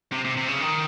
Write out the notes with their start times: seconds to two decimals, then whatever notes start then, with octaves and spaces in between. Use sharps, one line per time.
0.12 C3
0.25 C3
0.37 C3
0.48 C#3
0.60 D#3